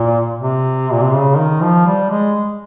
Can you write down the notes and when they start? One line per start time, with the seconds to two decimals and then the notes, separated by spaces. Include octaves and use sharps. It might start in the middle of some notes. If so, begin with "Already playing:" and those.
Already playing: A#2
0.41 C3
0.92 A#2
1.02 C3
1.13 C#3
1.37 D#3
1.61 F3
1.87 G3
2.11 G#3